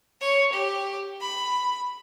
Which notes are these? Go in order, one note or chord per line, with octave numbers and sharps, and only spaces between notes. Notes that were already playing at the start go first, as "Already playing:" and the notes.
C#5
G4
B5